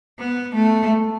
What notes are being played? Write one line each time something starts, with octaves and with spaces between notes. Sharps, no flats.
B3
A3